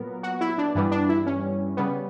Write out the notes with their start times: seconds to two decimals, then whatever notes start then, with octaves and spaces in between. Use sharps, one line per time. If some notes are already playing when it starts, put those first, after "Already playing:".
Already playing: A#2 F#3 B3 A#4
0.23 F#4
0.41 E4
0.58 D4
0.75 G2 E3 G3 B3
0.91 D4
1.09 E4
1.26 C#4
1.77 C#3 G3 B3